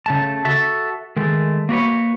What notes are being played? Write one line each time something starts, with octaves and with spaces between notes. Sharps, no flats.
C#3 A3 A5
F#4 A4 E5
D#3 G#3 A3
A#3 F#4 B4 C#5